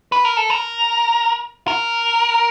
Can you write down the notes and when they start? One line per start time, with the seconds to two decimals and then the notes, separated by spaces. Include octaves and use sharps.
0.12 B4
0.25 A#4
0.37 A4
0.50 A#4
1.68 A#4